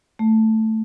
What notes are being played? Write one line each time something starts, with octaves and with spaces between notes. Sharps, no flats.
A3